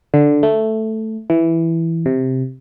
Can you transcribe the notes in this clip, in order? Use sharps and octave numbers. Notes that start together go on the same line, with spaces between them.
D3
A3
E3
C3